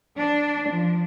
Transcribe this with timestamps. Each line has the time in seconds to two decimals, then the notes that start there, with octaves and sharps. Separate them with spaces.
0.18 D4
0.70 F3